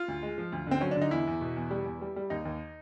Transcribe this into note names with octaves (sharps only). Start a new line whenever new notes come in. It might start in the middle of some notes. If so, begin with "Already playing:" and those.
Already playing: F4
D2
G#3
F3
D2
D3 C4
F#3 C#4
D4
D3 D#4
E2 E4
E2
B2
E2
G3
E2
G3
G3
D#2 D#4
D#2